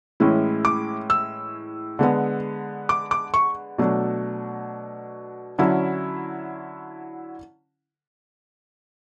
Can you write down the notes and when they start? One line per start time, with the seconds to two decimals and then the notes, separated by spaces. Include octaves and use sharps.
0.20 A2 E3 G#3 C#4 E4
0.65 D6
1.10 E6
1.99 D3 G#3 B3
2.89 D6
3.11 D6
3.34 C#6
3.78 B2 F#3 A3 D4
5.58 D3 F#3 C#4 E4